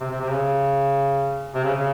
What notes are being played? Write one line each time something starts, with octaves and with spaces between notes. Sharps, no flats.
C3
C3
C3
C#3
C3
C#3
C#3